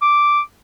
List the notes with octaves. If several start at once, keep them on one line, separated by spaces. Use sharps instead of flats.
D6